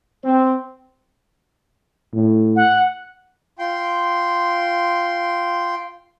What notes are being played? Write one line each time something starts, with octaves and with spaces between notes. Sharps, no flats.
C4
A2
F#5
F4 G5 C6